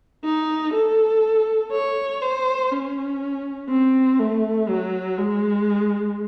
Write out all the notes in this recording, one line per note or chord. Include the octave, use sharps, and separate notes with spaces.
D#4
A4
C#5
C5
C#4
C4
A3
F#3
G#3